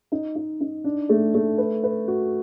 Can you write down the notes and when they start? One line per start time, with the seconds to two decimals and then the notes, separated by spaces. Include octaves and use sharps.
0.12 D#4
0.36 D#4
0.61 D#4
0.84 D4
1.09 A3
1.34 A3
1.58 B4
1.84 B4
2.08 F#4